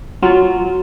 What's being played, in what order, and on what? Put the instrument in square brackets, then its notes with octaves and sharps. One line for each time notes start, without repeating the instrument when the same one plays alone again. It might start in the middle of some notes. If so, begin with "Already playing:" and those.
[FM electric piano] F#3 [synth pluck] F4 [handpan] F#4